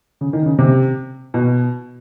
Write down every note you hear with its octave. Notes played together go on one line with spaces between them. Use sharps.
C#3
D#3
C#3
C3
B2